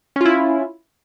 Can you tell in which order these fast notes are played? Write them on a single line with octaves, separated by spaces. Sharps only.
C#4 F4 E4